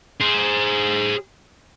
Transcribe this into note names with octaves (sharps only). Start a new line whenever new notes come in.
G#4 C5